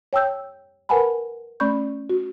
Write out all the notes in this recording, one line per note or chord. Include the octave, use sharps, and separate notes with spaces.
C#5 G5 A5 E6 G6
A#4 B4 F#5 G#5 A5 B5
A3 C#4 D5 B5 C#6 G6
F#4